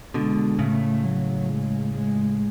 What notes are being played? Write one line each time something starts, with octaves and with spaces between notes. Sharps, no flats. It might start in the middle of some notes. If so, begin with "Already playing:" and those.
B2 D3 G#3
A2 C#3 A3
F#3
G#3
G#3